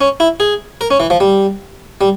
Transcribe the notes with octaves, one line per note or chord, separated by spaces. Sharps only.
C#4
E4
G#4
A#4
C#4
E3
F3
G3
G3